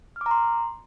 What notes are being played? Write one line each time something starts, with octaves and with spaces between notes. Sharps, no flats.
F6
D6
A#5
C6